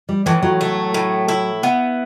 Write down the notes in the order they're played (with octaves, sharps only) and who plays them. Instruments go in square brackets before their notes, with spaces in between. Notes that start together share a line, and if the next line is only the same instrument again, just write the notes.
[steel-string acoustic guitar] G3
[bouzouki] A2 [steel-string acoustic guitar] E3
[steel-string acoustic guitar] F#3
[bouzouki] A3
A2
E4
B3